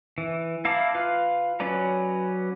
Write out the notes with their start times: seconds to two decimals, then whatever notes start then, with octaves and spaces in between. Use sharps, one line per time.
0.18 E3
0.65 E4 F5 A5 A#5 D6
0.94 F4 B4 F5
1.60 F#3 C#4 B4 D5 A#5